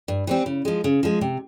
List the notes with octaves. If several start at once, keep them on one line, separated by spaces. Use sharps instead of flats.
G2
E3 G3 C4
C#3
F3 G#3
C#3
F3 G#3
C3